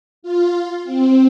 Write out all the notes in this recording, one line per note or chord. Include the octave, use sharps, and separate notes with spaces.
F4
C4